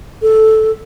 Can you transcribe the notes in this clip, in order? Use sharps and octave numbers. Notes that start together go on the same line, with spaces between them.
A4